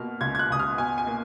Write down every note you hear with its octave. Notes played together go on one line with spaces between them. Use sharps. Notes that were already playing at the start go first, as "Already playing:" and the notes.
Already playing: B2 A#3 F6
C#2 G#6
G#6
F#6
C#2 D#6
F6
B2 G#5
G#5
A#3